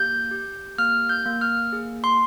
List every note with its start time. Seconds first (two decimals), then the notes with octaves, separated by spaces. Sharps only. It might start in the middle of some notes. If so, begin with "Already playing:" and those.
Already playing: A#3 G4 G6
0.31 G4
0.78 A#3 F6
1.09 G6
1.26 A#3
1.41 F6
1.73 G#4
2.04 C6